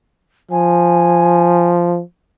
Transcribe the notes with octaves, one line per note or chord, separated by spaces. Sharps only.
F3 G#5